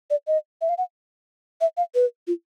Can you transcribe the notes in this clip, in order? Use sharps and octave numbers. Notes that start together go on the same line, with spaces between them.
D5
D#5
E5
F5
F#5
E5
F5
B4
F4